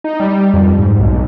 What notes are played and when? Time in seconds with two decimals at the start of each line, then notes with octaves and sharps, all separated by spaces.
0.04 D#4
0.20 G3
0.54 F2
0.79 G#2
0.99 B1